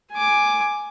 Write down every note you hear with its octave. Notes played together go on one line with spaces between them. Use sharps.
G#5 D6